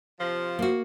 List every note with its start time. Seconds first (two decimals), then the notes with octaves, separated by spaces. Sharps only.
0.19 C3 F3
0.59 A#3 F#4